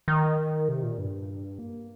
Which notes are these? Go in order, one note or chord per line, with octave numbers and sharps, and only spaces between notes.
D#3
C3
A#2
G2
A#3